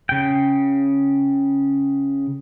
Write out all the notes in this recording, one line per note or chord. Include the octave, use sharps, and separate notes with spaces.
C#3 G5